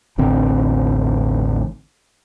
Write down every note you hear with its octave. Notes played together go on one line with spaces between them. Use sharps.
E1 A1 D3 C4